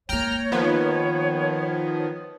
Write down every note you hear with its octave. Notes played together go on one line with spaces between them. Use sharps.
G#3 A#3 C#5 G5 A#5 F6
D#3 F3 B3